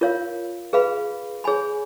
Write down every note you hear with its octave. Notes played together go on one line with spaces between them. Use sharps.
F4 A#4 C#5 F5
G#4 B4 F5 B5
G#4 C#5 G#5 B5